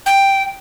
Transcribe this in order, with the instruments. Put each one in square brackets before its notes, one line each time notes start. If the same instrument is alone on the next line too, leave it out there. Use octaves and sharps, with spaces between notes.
[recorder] G5